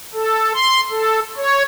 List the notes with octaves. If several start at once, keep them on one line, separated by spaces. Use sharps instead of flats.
A4
C6
A4
C#5